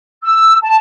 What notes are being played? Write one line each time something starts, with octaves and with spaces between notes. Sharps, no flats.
E6
A5